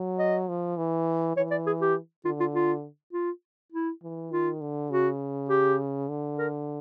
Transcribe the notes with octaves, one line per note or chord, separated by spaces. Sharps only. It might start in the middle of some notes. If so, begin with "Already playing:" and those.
Already playing: F#3
D#5
F3
E3
E3 C#5
D5
G#4
G4
D3 F4
F4
F4
F4
E4
E3
D#3 F4
D3
C#3 F#4
G4
D3
A#4